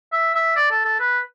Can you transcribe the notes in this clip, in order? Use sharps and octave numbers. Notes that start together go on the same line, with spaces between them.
E5
E5
D5
A4
A4
B4